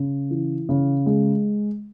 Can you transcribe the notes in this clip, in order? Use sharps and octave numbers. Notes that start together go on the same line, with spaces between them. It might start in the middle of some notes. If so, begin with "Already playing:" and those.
Already playing: C#3
E3
C#3
G#3